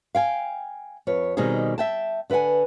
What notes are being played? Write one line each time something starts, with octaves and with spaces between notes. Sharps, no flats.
F5 G5 G#5
F2 B4 C#5
B2 D#3 G3 C4 D#4 G#4
E5 G5 A5
D3 B4 D#5 F#5 G#5